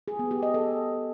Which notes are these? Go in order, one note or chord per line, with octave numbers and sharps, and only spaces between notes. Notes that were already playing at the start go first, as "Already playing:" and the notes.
G#4
B3
G4
D#5
A4